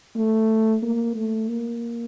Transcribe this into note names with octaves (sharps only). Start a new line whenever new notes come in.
A3
A#3
A3
A#3